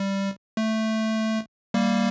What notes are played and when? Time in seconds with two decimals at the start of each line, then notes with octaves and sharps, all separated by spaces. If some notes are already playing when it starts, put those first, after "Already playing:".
Already playing: G3
0.57 A3
1.74 G3 A#3